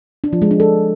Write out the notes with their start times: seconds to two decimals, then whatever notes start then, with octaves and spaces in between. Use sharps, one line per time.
0.24 D4
0.33 F3
0.42 G#3
0.51 D4
0.60 A4